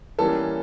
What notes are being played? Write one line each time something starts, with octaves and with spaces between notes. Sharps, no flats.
E3 G3 A#3 C#4 A4 A5